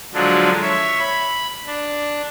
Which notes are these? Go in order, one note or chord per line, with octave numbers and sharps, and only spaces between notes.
D3 F3 F#3 G#3 D4
C#5 E5
B5
D4